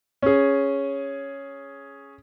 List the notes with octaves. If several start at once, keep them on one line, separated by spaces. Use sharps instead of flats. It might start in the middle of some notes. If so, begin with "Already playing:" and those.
C#4 G#4